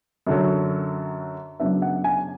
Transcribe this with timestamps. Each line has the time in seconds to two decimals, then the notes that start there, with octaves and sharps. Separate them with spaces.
0.27 F#2 D3 F#3
1.60 F#2 C#3 F#3 B3 D4 E5
1.82 F#5
2.04 G#5